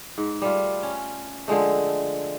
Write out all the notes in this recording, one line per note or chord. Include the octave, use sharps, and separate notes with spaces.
G#2
G3 A3 F4
C#4
D3 F3 G#3 A3